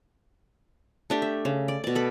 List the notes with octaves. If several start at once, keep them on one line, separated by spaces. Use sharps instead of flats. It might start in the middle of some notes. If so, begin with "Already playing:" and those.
A3 D4 G4
E5
C#3
D5
B2 D5
A4 B5